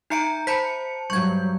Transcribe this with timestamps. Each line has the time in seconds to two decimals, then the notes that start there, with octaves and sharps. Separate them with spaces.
0.10 D#4 E5 A#5 G6 C#7 D7
0.47 C5 A5 B5 G6 B6 C#7
1.10 G2 F#3 C#6 G6 G#6